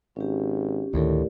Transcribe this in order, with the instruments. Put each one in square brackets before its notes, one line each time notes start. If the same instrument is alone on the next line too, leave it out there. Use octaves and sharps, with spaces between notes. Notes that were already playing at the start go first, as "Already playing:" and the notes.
[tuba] G#1 [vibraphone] C#4 G4
[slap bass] D2 D#3 [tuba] A2 [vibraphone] G4 A#4 D5